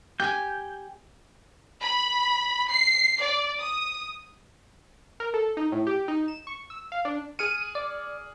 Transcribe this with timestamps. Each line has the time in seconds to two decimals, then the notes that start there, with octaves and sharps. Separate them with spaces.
0.20 G4 G#5 G6
1.82 B5
2.71 C7
3.19 D5
3.60 D#6
5.20 A#4
5.34 A4
5.57 D#4
5.72 A2
5.87 G4
6.08 D#4
6.28 E7
6.47 C#6
6.70 E6
6.92 F5
7.05 D4
7.39 G#4 F6 C#7 D#7
7.75 D5